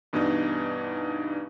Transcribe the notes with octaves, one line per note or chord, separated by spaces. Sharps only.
G2 B2 E3 D4 D#4